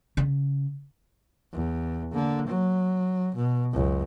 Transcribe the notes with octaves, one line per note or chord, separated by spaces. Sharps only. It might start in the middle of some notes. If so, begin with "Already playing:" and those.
C#3
E2
D3 A#3
F#3
B2
C#2 F#2